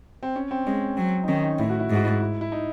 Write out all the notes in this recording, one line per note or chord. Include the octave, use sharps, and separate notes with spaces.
C4
C#4
C4
G#3 C#4
F#3 C4
D#4
D#3 C#4
D#4
A2 E4
F#4
E4
G#2
F#4
E4
E4
E4
D#4